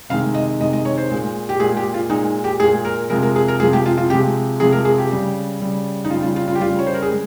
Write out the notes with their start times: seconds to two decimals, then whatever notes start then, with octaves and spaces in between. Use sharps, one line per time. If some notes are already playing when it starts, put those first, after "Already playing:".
0.10 C3 D#3 G#3 F5
0.35 D#5
0.59 C3 D#3 G#3 D#5
0.73 D#5
0.85 C#5
0.98 C5
1.11 A#2 G#3
1.49 G4
1.60 A#2 G#3 G#4
1.77 G4
1.94 F4
2.10 A#2 G#3 D#4
2.44 G4
2.60 A#2 G#3 G#4
2.85 A#4
3.10 C3 F3 G#3 A#4
3.23 A#4
3.36 G#4
3.48 A#4
3.60 C3 F3 G#3 G#4
3.73 G4
3.86 F4
3.98 F4
4.10 C3 F3 G#3 G4
4.60 C3 F3 G#3 G#4
4.72 A#4
4.85 G#4
4.98 G4
5.11 C#3 G3
5.60 C#3 G3
6.05 D#4
6.10 C#3 F4
6.14 G3
6.23 F4
6.36 F4
6.48 F4
6.55 G4
6.60 C#3 G3 F4
6.79 C#5
6.87 C5
6.94 A#4
7.02 G#4
7.11 G#3